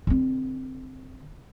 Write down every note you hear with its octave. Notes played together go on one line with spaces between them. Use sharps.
D3 C4